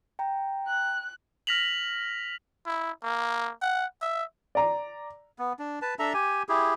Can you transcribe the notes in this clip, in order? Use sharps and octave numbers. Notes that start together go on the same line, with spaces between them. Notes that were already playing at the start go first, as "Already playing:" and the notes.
G5 A#5
F#6
F6 A#6 B6 F7 F#7
E4
A#3
F#5
E5
D5 A#5
B3
D4
B4 A5
D4 A4 E5 A#5
G4 G#5
E4 G4 G#4